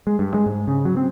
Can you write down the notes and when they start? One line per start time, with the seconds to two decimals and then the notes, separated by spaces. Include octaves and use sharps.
0.07 G#3
0.19 G2
0.34 G#3
0.46 G#2
0.68 C#3
0.85 F#3
0.97 C4